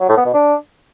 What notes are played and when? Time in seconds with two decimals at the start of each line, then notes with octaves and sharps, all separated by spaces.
0.01 F#3
0.09 A2
0.17 B3
0.26 B2
0.34 D4